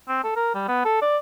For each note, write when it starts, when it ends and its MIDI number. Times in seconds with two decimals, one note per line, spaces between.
0.08 0.23 60
0.24 0.31 69
0.36 0.50 70
0.54 0.66 55
0.68 0.83 59
0.85 1.01 69
1.02 1.17 74